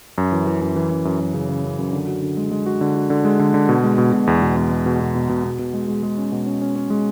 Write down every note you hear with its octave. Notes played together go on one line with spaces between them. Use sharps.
F#2
E3
E3
F#2
E3
F#2
F#2
F#2
C#3
C#3
F#2
F#2
D3
F#4
D3
G#3
G#3
F#4
D3
F#4
D3
G#3
D3
D3
B2
G#3
B2
B2
E2
B2
E2
G#3
B2
B2
B2
B2
B2
B2
G#3
G#3
G#3
C#4
B2
C#4
C#4
C#4
G#3